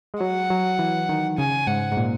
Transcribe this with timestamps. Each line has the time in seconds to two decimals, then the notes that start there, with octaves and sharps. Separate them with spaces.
0.14 G#3
0.20 F#3 F#5
0.50 F#3
0.79 E3
1.09 D#3
1.38 C#3 G#5
1.67 G#2 F#5
1.92 G#2
1.97 A#2